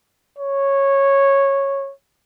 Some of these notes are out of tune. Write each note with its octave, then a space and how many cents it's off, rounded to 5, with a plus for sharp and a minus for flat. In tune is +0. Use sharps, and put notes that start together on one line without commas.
C#5 -10